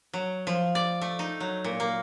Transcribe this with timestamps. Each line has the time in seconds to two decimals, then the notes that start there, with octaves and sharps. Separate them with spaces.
0.13 F#3
0.47 F3
0.75 D5
1.01 A3
1.19 D#4
1.40 F#3
1.64 A#2
1.80 A#3